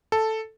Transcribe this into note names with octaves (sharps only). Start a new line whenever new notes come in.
A4